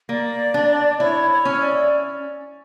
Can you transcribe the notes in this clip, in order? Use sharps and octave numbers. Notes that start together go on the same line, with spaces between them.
A#3 D5
D4
E4 C#5
C#5
C#4
D5